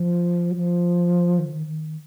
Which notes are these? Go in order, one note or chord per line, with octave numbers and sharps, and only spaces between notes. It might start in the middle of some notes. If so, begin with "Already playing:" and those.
Already playing: F3
F#3
F3
D#3
D3
D#3
D#3